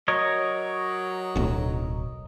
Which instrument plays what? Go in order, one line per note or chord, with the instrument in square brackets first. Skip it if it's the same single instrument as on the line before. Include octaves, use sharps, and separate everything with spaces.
[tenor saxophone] F#3 [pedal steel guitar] A#4 C#5 D#5
[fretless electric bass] D1 B1